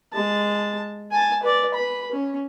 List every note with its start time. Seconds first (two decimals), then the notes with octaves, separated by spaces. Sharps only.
0.13 G#3 A5
1.12 G#5 A5
1.43 B4 D5
1.74 B4 B5
2.12 C#4